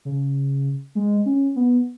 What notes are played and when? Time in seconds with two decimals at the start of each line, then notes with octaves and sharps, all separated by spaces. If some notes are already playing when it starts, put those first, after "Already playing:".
0.05 C#3
0.95 G#3
1.26 C#4
1.56 B3